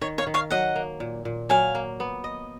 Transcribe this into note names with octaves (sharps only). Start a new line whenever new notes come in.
D#3 C#5
C#5 F5
D#3
C#5 F5
F#3 D#5 F#5
A#3
A#2
A#2
F#3 F5 G#5
A#3
B3
D#5